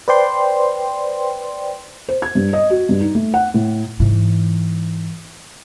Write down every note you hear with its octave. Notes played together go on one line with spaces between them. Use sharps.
B4 C5 D5 G5 C6
C5
G#6
G2
D#5
F#4
G2
D#4
A3
F#5
A2
G#2 E3